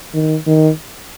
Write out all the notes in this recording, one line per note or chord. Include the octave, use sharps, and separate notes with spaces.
D#3
D#3